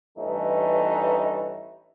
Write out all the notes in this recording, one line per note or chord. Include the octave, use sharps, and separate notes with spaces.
A1 G2 E3 A3 C#4 D#4